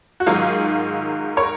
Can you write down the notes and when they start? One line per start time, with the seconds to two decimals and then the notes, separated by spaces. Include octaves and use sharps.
0.20 F#4
0.26 G#2 D#3 F#3 F4 G#4
1.37 A#4 C#5